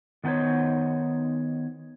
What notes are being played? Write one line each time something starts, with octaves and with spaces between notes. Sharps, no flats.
D#3 B3 D#4 C5 C#5